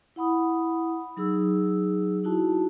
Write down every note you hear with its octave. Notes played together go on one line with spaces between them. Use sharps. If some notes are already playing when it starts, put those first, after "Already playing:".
E4 F#5 B5 D#6
F#3 D#4 G#4 E6
D#4 E4 F#4 A5